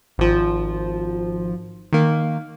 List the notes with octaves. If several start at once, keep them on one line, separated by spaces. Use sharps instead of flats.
G#1 F3
D#3 A#3